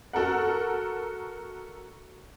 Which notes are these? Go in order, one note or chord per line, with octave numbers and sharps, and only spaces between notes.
F#4 A4 A#4 F#5